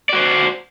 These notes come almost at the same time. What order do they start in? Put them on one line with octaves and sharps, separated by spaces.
D5 F#4 C5